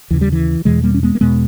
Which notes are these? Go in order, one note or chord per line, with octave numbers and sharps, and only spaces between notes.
D#2 C#3 E3
G3
E3
E2 B2 E3 G#3
G3 A#3
C#4
G#3 B3
A#3
E2 B2 G#3 B3